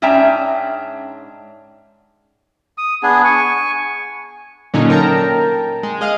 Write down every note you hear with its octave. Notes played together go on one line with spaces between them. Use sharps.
G#2 C#4 D4 E5 G5 A#5
D#6
B3 D4 G#4
G#5 C#6
A#2 D3 F#3 C#4 D#4
A#4 G5 A5 A#5
G#3
G#4 D#5 F5